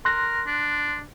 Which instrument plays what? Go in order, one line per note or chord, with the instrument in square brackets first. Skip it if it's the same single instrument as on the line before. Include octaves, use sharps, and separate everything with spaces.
[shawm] A#4 [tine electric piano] C6 F#6 A#6
[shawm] D4